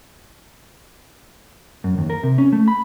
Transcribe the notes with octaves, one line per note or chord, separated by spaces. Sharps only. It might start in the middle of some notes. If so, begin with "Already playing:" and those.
F#2
D#2
A#4
C3
C#4
A3
B5